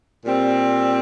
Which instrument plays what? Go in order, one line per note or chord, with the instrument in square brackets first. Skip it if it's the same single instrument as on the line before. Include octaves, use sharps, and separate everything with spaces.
[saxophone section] A#2 G3 C4